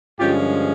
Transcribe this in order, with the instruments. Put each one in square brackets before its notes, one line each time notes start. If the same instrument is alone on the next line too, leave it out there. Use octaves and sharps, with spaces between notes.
[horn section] G2 D3 F3 G#3 C#4 F4 G4